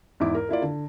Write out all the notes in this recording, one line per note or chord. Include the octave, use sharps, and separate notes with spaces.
E2 G#2 E4 D6
A#4
A#3 E4 F4 D5
D3